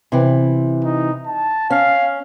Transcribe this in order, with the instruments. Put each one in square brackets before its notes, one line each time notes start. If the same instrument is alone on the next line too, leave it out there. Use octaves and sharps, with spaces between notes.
[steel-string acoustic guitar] C3 E3
[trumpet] D#4
A5
[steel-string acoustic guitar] C#4 [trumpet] F5